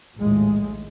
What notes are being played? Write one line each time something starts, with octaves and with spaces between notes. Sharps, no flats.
A#1 D#2 A2 G#3